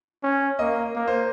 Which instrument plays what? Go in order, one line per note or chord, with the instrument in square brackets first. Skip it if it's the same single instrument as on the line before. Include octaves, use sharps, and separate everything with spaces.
[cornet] C#4
[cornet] A#3 [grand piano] D#5
[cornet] A#3
[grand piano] C5